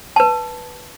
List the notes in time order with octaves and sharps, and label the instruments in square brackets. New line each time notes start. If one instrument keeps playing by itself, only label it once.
[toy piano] B4 A5